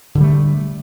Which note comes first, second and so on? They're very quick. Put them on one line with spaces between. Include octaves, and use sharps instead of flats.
D3 E3 G3 A3